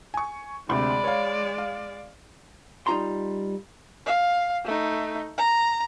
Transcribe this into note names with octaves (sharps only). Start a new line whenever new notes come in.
G#5 C#6
D2 C3 G#3 D5 B5
C#5 F5
F5
G3 D#4 F4 A#5 C6
F5
A3 D#4
A#5